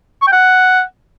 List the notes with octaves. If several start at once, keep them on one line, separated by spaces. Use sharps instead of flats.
C#6
G5
F#5